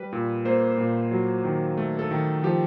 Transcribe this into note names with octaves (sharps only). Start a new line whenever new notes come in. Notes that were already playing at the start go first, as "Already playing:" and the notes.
Already playing: G3 B4
A#2
A#3 C5
A#2
F#3
D#3
A3
A4
D#3
F3 G4